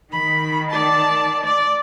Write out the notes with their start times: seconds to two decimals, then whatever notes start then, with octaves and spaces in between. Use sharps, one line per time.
0.12 D#3 B5
0.71 D5 A5
1.45 D5